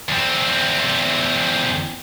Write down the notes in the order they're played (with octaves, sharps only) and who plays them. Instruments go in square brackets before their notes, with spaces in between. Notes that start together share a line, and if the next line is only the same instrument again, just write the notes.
[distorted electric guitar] E2 C4